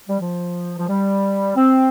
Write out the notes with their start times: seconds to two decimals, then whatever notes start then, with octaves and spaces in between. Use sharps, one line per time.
0.08 G3
0.20 F3
0.78 F3
0.88 G3
1.56 C4